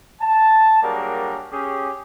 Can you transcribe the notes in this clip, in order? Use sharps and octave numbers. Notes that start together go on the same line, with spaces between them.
A5
F#3 G3 A#3 D4 G#4 A#4
C#4 G4 G#4